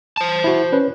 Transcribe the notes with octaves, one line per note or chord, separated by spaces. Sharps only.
C5 A5
E4 F#4
C#4 B4 C#5